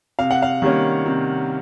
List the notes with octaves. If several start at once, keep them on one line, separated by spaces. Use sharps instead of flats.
C3 F5
F#5
F5
D#3 G3 A#3 C#4
C3